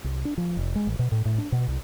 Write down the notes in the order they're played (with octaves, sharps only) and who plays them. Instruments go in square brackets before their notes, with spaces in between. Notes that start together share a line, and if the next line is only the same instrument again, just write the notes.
[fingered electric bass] C2
D4
F3
F1
G#3
A1
B2
A2
A2
D4
B2
C2